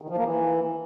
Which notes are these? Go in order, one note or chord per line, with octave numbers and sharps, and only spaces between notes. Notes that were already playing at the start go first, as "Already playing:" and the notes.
D#3
F3
A#3
E3